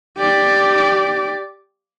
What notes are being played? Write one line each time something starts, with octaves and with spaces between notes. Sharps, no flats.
G4 D5